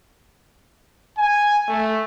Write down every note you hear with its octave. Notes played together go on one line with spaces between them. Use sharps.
G#5
A3